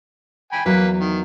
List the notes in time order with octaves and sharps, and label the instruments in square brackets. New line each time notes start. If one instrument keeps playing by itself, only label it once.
[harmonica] G5 G#5 B5
[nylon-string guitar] E2 F#3 [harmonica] A#3 B4
[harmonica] D#3